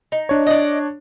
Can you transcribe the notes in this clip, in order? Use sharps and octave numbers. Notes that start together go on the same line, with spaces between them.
D#4
D4 C#5
D5 D#5